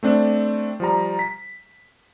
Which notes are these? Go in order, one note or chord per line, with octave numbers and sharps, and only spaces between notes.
A3 C4 D4
F3 G3 A#5
B6